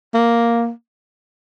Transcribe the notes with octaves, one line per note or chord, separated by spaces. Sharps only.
A#3